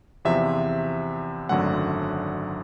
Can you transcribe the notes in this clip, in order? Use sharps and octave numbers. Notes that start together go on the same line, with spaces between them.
E2 C3 F3 E5
G#1 F#2 D3 F#3 A3 F#5